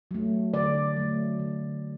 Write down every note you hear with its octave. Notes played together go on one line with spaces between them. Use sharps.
F#3 A3
D3 D5
F#3 A3
D3